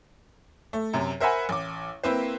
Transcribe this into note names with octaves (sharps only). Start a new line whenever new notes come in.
A3
F#2 C3
A#4 C5 E5 F#5 G#5 B5
A1 D6
A#3 C4 E4 B4 C5